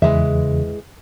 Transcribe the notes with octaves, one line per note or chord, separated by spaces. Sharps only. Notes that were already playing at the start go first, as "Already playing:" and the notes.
E2 C#3 E3 G#3 E5